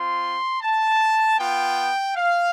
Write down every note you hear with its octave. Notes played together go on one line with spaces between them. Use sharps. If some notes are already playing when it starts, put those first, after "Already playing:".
Already playing: C4 F4 C6
A5
B3 F4 G5
F5